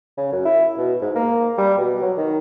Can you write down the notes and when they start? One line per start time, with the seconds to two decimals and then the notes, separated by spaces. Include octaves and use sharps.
0.18 C#3
0.32 F#2
0.45 E4
0.78 B2
1.02 G#2
1.15 A#3
1.58 G3
1.78 B2
2.02 F#3
2.17 D#3